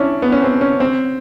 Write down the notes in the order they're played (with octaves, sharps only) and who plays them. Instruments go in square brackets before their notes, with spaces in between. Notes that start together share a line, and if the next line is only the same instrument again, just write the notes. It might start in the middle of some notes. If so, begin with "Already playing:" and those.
Already playing: [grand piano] C#4 D4 E4
B3
C#4
C4
C#4
C4